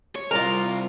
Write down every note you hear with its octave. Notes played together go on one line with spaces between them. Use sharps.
C#5
C3 G3 F4 A#4